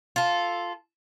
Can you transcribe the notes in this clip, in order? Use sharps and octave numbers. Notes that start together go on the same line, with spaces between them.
F4 A4